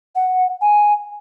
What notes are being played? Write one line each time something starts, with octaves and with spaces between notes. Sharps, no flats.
F#5
G#5